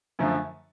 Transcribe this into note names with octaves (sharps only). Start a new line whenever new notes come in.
F#2 D3 F3 A3